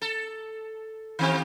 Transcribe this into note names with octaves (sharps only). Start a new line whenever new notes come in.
A4
D#3 C4 G4